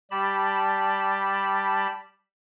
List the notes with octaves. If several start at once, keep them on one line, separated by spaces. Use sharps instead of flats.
G3 G4 A5 B5